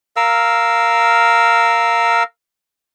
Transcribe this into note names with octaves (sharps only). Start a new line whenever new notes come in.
A#4 F5 E6